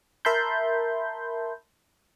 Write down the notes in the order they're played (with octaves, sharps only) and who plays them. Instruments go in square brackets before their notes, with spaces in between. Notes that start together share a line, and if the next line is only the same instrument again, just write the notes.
[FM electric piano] A#4 E5 A5 B5 C6 G6